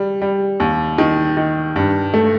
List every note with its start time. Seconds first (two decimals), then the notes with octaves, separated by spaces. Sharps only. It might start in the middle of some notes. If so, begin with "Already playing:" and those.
Already playing: G3
0.21 G3
0.60 D#2
0.98 D#3
1.37 D#3
1.76 G2
2.14 A3